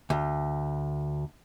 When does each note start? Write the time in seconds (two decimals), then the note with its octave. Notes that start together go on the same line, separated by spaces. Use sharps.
0.10 D2